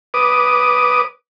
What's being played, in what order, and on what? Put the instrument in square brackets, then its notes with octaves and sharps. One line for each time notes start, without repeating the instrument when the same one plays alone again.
[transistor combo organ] B4 D6 D#6